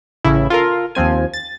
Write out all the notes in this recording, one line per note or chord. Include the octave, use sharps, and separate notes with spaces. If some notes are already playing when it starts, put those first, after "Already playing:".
A1 C#3 E4
F4 A4 A#4
D#2 F3 C4 G#5
A6